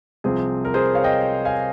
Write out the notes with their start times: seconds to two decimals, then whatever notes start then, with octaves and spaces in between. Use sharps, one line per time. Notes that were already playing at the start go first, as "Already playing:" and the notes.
0.24 C2 C3 F3 C4 G#4
0.65 A#4
0.74 G#4 C5
0.94 C#5 F5
1.04 D#5 G5
1.45 F5 G#5